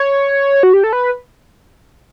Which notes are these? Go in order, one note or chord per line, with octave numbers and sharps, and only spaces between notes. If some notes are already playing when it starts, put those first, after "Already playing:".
Already playing: C#5
F#4
G4
A4
B4